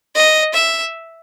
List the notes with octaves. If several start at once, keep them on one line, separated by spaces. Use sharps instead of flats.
D#5
E5